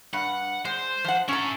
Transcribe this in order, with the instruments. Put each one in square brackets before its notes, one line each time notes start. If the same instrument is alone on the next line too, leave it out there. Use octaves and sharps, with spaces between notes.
[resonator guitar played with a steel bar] G2 [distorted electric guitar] F#5
[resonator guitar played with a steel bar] G#3 [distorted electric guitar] C5
[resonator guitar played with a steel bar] F3 F#5
[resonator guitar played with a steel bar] C#4 A#5 [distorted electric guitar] E4 A4